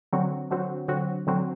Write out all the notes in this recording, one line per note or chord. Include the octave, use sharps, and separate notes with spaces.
D3 F#3 C4 F#4
D3 F#3 C4 F#4
D3 F#3 C4 F#4
D3 F#3 C4 F#4